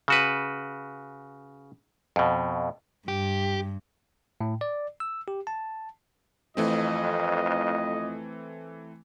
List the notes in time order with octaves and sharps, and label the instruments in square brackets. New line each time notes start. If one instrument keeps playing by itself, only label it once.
[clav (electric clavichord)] C#3 F#4 B4
F2 B2
[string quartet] G2 [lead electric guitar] G4
[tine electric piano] A2
D5
E6
G4
A5
[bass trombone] F2 [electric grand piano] E3 A3 C4 [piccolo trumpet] D#5